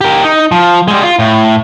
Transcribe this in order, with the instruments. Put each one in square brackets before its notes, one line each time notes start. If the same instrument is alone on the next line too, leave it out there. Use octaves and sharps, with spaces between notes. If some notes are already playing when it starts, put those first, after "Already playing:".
[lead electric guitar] G4 A#4
D#4
F3
G3 G#3
F4
A2